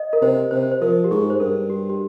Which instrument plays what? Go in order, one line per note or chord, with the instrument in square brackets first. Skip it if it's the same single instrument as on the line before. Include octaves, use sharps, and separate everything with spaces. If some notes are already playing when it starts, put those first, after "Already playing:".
Already playing: [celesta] D#5
A#4
[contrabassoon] C3 [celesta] C5
[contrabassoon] C3 [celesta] C5
[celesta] C5
[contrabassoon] F3 [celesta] A#4
[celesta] G4
[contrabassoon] G#2 [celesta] G#4
[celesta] C5
[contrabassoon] G2 [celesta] A#4
[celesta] G4
G4